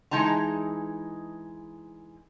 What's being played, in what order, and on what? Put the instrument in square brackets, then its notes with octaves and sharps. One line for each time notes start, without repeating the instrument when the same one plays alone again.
[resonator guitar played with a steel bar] E3 G#3 D#4 A5 A#5